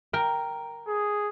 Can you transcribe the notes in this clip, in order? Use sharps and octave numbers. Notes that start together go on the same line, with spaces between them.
A#4 G5
G#4